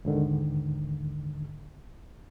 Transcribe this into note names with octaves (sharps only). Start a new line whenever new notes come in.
D#2 G#2 D3 D#3